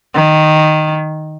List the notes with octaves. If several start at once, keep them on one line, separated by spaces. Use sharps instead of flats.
D#3